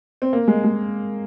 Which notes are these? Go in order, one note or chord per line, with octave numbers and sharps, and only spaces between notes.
C4
A#3
G#3
G#3